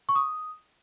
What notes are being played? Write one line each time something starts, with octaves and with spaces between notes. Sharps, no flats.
C#6
D#6